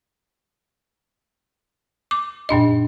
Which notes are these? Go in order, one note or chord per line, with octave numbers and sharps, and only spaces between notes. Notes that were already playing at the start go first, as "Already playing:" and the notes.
D6
F#2 A#2 D4 D#5